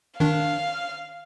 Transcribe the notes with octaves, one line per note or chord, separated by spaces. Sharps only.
D#3 D4 F5